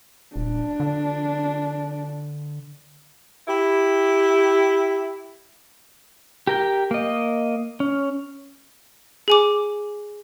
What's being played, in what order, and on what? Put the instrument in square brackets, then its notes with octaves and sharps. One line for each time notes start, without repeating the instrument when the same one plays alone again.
[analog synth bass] D#1 [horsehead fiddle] D4
[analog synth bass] D3
[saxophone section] E4 G4
[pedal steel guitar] G4 A#4 G5
A#3 D#5
C#4
[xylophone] G#4 G#5 D6